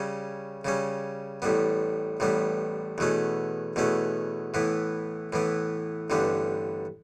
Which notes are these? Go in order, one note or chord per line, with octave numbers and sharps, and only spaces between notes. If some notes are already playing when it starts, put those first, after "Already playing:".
Already playing: C#3 G3 C#4
C#3 G3 C#4
A1 A2 G3 B3
A1 A2 G3 B3
E2 B2 A3 C#4
E2 B2 A3 C#4
A2 E3 B3
A2 E3 B3
A1 G2 D3 G3 B3